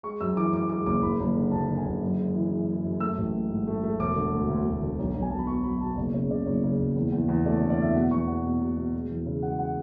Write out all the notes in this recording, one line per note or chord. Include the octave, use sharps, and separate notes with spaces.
G#3 C#6
F#2 E6
E3 D6
F#2 D6
G#3 D6
F#1 D6
F#1 B5
F#1
D3
F#1 A5
D3
G#5
F#1
F#2
G#3
E3
E3
E3
F#2
A3 E6
A1
A3
G#2
A3
A3
E1 D6
D3
D2
D2
D2
D3
B1
B1
G#5
B1 A5
B5
B2 C#6
F#3 B5
B2 A5
F#1 D5
C#3 C#5
C#3 D5
F#1 C#5
C#3
F#1
E2
E2
E2
A3 D5
C#5
D3
D5
E2 E5
B2 F#5
E2 C#6
B2 F#5
B2
B2
B2
G#3
E2
C#3
G#3 F#5
F#5